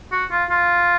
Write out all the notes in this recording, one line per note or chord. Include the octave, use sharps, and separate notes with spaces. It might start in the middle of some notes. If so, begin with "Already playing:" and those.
F#4
F4
F4